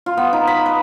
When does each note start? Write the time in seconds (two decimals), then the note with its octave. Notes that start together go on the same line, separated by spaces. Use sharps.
0.06 F4
0.17 B3
0.33 D#4
0.47 B5
0.66 B4